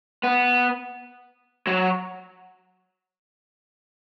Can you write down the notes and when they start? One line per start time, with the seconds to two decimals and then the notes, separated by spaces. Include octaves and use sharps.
0.24 B3
1.67 F#3